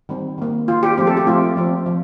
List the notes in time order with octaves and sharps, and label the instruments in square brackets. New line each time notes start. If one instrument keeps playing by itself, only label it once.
[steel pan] D#3 G3 C4
D#3 A#3
D#3 A#3 F4
G4
F3 A3 C4 G4
A4
G4
F3 A3 C4 F4
F3 C4
F3